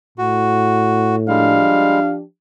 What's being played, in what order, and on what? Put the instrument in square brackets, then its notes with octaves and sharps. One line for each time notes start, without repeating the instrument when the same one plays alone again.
[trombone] A2 [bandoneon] F#4
[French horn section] F3 D4 G4 [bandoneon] G3 G#3 [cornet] F5